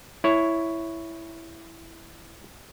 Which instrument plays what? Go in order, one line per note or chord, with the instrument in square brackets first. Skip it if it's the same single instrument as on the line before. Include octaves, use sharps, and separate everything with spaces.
[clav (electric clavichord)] E4 C#5